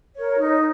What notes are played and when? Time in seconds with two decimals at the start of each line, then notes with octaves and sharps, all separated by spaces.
0.15 A#4 C#5
0.39 D#4